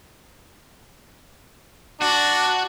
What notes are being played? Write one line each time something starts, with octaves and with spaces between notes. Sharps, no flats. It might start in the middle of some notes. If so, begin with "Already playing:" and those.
D4 F#4